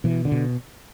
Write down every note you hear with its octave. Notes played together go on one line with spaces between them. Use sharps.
B2 E3
D3
B2